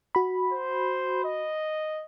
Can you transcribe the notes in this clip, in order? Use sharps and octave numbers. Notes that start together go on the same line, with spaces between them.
F#4 B5
C5
D#5